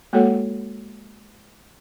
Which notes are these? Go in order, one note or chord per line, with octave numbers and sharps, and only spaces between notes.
G#3 A#3 F#4 A4 C#5 F#5